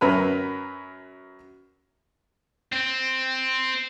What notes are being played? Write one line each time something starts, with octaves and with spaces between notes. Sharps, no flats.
F#2 F#3 A#4 B4
C4